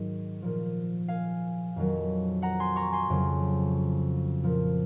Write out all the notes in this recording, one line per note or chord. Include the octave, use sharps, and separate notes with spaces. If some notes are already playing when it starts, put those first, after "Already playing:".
Already playing: G#2 D#3 F#3
A#2 F3
F5 G#5
F2 D#3 F#3
F#5 A#5
G#5 C6
A#5 C#6
G#5 C6
F2 C#3 F#3
A#2 F3